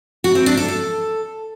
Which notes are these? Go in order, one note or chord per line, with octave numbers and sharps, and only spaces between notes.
F#4
C4
D4
A4
A4